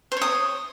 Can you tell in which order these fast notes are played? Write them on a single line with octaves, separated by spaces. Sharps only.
C5 C#5 D#6